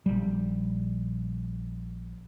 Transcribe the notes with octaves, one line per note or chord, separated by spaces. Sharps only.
A#1 G3